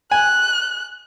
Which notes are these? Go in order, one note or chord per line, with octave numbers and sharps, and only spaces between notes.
G#5 F#6